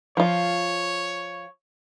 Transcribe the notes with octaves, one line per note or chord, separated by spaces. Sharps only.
F3 F4 C#5